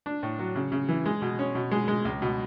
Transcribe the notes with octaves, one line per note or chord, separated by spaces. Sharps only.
D4
A2
F#3
C#3
C#3
E3
G#3
B2
C#4
B2
G#3
G#3
C#2
B2